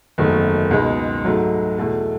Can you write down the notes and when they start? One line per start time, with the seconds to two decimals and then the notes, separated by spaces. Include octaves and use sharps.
0.18 F#1 E2 D#3 A3
0.71 C#2 B2 G#3 D#4
1.25 G#2 F#3 A3 D#4
1.78 E2 B2 A3 E4